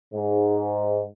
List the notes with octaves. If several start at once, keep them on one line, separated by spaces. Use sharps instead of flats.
G#2